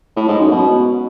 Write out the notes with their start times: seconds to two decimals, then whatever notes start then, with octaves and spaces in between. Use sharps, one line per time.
0.16 A2
0.28 G#2
0.39 F#2
0.51 B2